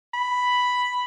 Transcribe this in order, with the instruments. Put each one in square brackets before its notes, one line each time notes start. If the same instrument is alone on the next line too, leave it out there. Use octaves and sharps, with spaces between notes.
[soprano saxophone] B5